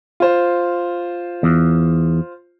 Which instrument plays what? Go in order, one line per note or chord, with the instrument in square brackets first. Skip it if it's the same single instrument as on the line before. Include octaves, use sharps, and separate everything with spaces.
[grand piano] F4 C5
[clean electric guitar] E2